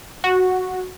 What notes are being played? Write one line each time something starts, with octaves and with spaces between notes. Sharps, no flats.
F#4